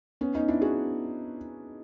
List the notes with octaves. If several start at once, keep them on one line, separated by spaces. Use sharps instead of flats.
B3 C#4
C#4 D#4
D4 E4
F#4 G#4